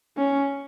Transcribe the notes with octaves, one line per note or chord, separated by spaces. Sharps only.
C#4